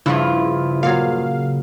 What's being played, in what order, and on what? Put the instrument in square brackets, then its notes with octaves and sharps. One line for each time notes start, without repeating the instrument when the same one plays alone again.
[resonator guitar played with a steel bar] G2 F3 F4 [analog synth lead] C#3 [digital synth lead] E4
[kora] A#2 F#3 [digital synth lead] F5